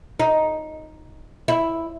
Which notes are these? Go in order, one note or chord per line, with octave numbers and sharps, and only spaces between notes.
D#4
E4